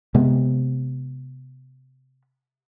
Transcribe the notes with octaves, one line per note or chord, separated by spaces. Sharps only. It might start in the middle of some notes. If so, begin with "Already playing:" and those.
C3 G#3 B3